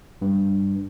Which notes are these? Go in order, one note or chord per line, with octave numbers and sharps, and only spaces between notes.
G2